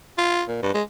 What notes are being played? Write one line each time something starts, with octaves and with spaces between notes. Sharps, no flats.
F4
A#2
G2
G#3